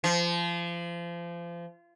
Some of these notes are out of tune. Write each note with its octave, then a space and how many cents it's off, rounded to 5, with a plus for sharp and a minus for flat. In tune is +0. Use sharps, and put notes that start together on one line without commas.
F3 -30